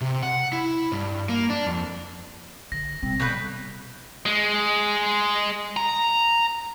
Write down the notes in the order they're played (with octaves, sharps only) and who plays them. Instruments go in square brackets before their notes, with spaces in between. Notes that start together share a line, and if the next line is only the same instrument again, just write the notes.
[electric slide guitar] C3
F#5
E4
G2
A#3
D4
F2
[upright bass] D3 [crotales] A#6
[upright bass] C3 G3 [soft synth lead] C4
[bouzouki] B2 D3 B4 [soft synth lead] G6
[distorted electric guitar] G#3
A#5